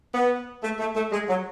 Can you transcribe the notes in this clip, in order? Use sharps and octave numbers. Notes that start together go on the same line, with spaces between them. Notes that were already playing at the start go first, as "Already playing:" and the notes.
B3
A3
A3
A3
G#3
F#3